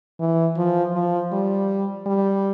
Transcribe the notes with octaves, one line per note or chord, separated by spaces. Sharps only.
E3
F3
F3
G3
G3